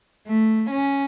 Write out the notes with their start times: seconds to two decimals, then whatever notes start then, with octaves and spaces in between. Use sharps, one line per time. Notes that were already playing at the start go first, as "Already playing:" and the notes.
0.27 A3
0.71 C#4